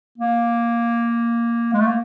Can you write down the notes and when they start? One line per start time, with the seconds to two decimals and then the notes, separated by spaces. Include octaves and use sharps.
0.18 A#3
1.73 G#3
1.80 A3
1.87 A#3